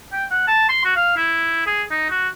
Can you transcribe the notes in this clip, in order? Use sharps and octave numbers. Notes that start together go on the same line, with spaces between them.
G5
F#5
A5
C6
F#4
F5
E4
G#4
D#4
F#4